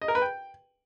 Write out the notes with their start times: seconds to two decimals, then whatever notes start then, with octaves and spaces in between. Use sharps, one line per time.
0.02 D#5
0.08 A#4
0.15 B4
0.22 G5